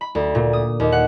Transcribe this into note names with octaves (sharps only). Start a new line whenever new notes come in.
B5
D2
A#2
D#6
D#2
F#5